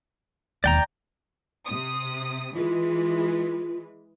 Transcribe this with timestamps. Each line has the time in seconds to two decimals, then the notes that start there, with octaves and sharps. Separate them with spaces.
0.64 E1 D#2 D5 G5 A#5
1.65 C3 D#6
2.55 E3 G#3 F4 B4